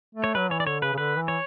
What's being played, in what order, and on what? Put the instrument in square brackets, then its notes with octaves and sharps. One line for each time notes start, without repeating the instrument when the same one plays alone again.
[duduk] A3
[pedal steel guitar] C#5
[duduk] F#3 [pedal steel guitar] B4
[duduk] E3 [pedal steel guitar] C#5
[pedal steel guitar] D5
[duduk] D3 [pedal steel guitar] C#5
[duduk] C#3 [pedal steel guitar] B4
[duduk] C#3
[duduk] D3 [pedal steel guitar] B4
[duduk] E3
[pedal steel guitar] C#5